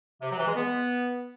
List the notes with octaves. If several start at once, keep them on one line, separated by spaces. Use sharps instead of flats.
C3
F#3
E3
G#3
B3